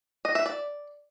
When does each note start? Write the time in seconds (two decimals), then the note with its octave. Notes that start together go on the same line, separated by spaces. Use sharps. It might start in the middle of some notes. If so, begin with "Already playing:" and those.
0.25 D#5
0.35 E5
0.46 D5